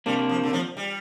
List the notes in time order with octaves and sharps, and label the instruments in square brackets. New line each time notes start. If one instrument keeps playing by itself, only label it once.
[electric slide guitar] C3 A#3 D4 [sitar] G3
[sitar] F3
D3
F3
G3